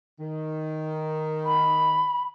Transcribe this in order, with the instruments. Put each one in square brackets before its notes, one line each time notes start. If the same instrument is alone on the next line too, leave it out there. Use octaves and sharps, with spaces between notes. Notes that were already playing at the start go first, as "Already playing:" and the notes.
[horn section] D#3
[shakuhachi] B5